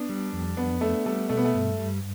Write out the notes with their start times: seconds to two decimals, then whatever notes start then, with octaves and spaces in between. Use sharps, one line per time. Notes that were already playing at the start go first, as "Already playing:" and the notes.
Already playing: B3 D4
0.09 G3
0.33 F2
0.57 B3 D4
0.81 A3 D4
1.06 G3 A3
1.29 B2 A3
1.37 B3
1.45 A3
1.54 G2
1.78 G3